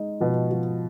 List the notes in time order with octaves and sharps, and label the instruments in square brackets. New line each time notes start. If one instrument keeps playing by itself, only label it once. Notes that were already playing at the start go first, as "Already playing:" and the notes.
Already playing: [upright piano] G#3 D#4
[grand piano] B2 [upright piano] F3
[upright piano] F3